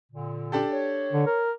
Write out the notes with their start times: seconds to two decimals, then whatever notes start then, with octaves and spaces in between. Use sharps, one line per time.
0.12 A#2 D3
0.52 D4 G4 A4
0.71 C#5
1.13 D3
1.27 A#4